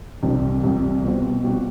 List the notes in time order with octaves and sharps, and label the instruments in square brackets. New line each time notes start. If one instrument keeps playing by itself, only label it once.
[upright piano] C2 C3 G3
C2 C3 G3
B2 G3 C4 F#4
B2 G3 C4 F#4